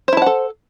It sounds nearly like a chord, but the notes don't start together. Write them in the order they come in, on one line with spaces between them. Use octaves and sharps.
C5 E4 A5 F#5 A4